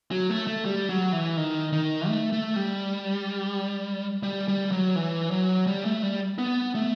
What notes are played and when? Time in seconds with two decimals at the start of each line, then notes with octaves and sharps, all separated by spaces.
0.11 F#3
0.30 A3
0.47 A3
0.65 G3
0.89 F#3
1.12 E3
1.37 D#3
1.73 D#3
2.08 A3
2.33 A3
2.56 G3
4.23 G3
4.48 G3
4.72 F#3
4.96 E3
5.31 F#3
5.67 G3
5.85 A3
6.03 G3
6.38 B3
6.75 A3